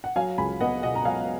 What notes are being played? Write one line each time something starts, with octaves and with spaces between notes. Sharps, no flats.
F#5
F#3 F5 G#5
C#2 G#5 B5
B3 D#5 F#5
B2 D#5 F#5
A#5
F#3 F5 G#5